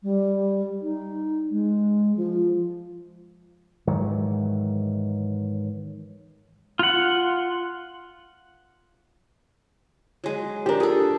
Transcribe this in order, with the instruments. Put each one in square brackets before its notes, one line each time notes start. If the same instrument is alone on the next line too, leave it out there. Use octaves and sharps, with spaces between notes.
[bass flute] G3
D#4
G#3
F3
[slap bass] G#2 D#3 E3 F#3
[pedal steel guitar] F4 F#5
[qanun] F#3 G#3
[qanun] F3 D4 [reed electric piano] G4 A#4
[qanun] G#4 A4